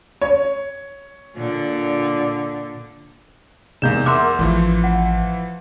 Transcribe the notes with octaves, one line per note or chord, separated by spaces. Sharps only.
C#5
A#2 D3
E2 G#2 C3 A#3 G6 E7
A#4 E5 F#5 C6 D6
A1 E3 F3
F#5